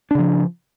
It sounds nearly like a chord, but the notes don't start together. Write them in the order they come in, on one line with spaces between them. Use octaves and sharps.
D4 C#3 F3